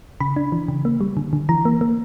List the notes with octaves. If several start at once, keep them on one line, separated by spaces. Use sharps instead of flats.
C#3 B5
D4
E3
C#3
A#3
G3
D3
D3
E3 A#5
A#3
A#3